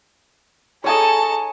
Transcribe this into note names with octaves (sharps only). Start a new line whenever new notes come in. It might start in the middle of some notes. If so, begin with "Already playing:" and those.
D#4 G#4 A4 C#5 G#5 A5 D#6